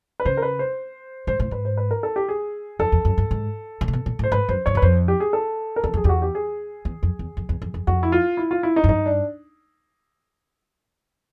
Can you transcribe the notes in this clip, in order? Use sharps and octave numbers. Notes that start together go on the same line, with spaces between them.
B4
C#3 C5
A#4
B4
C5
G#2 C5
A2 C5
G#2 B4
C5
B4
A#4
A4
G4
G#4
F2 A4
E2
F#2
G2
G#2
A2
A#2
B2
A#2
A2
C5
G#2 B4
F#2 C5
G2 C#5
F#2 B4
F2 C5
G4
G#4
A4
A#4
E2 A4
F2 G#4
E2 F#4 G4
G4
G#4
E2
F2
E2
F2
E2
F2
F2
F2 F#4
E4
F4
E4
F4
E4
D#4
F#2
G2 D#4
D4